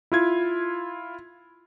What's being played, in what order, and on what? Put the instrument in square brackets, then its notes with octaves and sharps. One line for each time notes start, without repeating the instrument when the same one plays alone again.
[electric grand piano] E4 F4 G#6